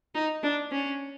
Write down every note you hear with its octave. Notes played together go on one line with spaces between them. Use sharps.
D#4
D4
C#4